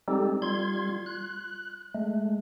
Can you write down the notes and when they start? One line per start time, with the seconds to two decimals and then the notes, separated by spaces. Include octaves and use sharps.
0.08 G3 G#3 C4 D#4 G4 A4
0.42 G3 F4 C6 G#6
1.06 F#6
1.95 G#3 A3